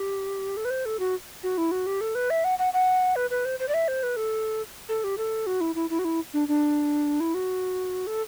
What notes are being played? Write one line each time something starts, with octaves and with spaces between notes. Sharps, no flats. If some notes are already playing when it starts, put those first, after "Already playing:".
Already playing: G4
A4
B4
C5
A4
F#4
F#4
E4
F#4
G4
A4
B4
E5
F#5
F#5
F#5
B4
B4
C5
C5
D5
E5
C5
B4
A4
A4
G4
A4
F#4
E4
E4
E4
F#4
E4
D4
D4
E4
F#4
A4